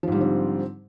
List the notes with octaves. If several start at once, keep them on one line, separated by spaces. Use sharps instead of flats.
G#2 D3 F3 G3 C4